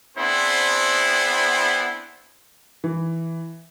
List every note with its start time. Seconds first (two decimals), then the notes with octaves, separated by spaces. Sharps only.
0.18 B3 C4 D4 E4 G#4 C5
2.84 E3